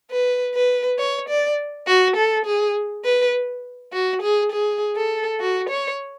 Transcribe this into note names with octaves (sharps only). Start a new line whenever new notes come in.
B4
B4
C#5
D5
F#4
A4
G#4
B4
F#4
G#4
G#4
A4
F#4
C#5